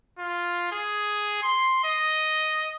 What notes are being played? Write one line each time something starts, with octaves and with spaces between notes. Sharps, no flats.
F4
G#4
C6
D#5